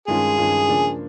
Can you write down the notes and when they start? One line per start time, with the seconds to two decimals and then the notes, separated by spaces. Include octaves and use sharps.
0.07 G2 D#3 G#3 C#4 F4 G#4
0.38 G2 D#3 G#3 C#4 F4
0.69 C#3 F3 A#3 D4